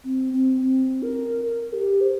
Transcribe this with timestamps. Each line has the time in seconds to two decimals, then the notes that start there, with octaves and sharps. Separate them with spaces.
0.04 C4
0.33 C4
0.61 C4
1.03 A#4
1.45 A#4
1.73 G4
2.01 C5